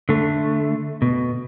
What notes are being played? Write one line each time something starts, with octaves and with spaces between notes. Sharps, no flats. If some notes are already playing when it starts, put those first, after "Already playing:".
D3 A3
B2